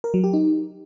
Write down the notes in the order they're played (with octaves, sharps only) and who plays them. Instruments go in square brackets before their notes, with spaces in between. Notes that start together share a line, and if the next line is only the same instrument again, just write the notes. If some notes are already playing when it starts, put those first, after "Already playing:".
[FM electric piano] A#4
F#3
G4
D#4